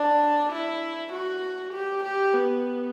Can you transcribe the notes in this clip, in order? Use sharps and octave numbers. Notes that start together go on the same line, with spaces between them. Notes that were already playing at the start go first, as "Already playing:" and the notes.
Already playing: D4
E4
F#4
G4
G4
B3